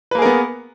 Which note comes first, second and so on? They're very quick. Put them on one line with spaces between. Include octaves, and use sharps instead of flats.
B4 A#3 G#4 A#4 B3